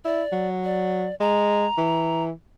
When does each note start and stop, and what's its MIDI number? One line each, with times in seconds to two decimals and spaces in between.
0.05 0.23 64
0.05 0.47 74
0.32 1.07 54
0.65 1.15 74
1.20 1.66 56
1.20 2.23 82
1.77 2.31 52